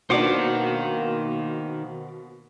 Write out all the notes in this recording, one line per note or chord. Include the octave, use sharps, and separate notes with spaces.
B2 D#3 A#3 D4 C5 F#5 D6